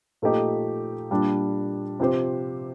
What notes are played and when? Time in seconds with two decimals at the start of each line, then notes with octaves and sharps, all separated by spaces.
0.22 A#2 F3 A3 D#4 G4
1.11 A#2 G3 D4
2.00 C3 F3 C4 G4 C5